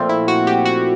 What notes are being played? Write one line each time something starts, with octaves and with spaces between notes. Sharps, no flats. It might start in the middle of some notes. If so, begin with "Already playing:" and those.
Already playing: A#2 F3 A3 C4 F4
E4
F#4
G4
F#4